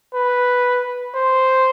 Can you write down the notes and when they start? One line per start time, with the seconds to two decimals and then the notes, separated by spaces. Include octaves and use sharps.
0.14 B4
1.14 C5